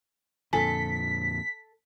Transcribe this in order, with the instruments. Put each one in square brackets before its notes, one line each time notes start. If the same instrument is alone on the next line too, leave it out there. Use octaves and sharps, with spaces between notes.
[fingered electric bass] F2 A#2 D3 [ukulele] A4 [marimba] G#5 [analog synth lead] B6